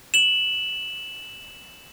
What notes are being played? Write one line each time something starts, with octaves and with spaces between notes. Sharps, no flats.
E7 F#7